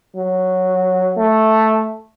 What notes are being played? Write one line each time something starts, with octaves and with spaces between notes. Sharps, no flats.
F#3
A3